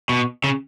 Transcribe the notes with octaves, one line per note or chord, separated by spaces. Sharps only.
B2
C#3